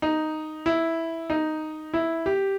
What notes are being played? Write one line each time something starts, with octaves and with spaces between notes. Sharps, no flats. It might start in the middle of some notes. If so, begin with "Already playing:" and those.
D#4
E4
D#4
E4
G4